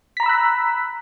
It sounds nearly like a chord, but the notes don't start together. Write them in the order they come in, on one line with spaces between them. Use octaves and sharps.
B6 A#5 B5 E6 F#6